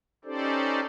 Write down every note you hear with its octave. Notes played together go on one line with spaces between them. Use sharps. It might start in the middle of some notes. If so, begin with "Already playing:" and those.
C#4 D#4 G4 A4 C5 D5